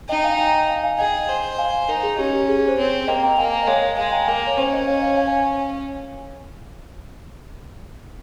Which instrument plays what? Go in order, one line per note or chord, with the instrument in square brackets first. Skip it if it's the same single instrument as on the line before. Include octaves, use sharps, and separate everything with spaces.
[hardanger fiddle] D#4 [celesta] D#5 G5
[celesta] F5 G#5
G5 A#5
F5 G#5
F5 G#5
[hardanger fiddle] G#4 [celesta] D#5 G5
[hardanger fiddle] C5
[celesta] F5 G#5
[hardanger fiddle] D#4 [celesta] A#4
[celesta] G#4
[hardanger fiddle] C#4 [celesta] G4
[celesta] G4
G#4
G#4
C5
[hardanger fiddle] C4 [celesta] C#5
[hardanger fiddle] A#3 [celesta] D#5 G5
[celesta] G5 A#5
[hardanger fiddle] A#3 [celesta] F5 G#5
[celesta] D#5
[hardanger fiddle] G#3 [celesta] C#5 F5
[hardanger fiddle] G#3 [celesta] F5 G#5
[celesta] G5 A#5
[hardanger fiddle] A#3 [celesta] F5 G#5
[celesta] C#5
[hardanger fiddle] C#4 [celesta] C5
[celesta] C5 D#5
C#5 F5
C#5 F5
F5 G#5
F5 G#5